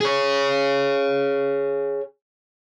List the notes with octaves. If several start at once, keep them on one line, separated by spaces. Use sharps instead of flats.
G#4 C#5